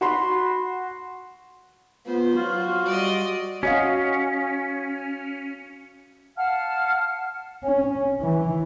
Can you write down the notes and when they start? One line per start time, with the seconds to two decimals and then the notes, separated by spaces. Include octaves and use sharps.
0.01 F#4 B5 C6
2.07 B3 F4 C5
2.37 F#3 F4 F#4
2.86 G3 D5 D#5
3.63 C#4 F#4 D#5 F5
6.37 F5 F#5 A5 F6
7.64 C#4
8.21 E3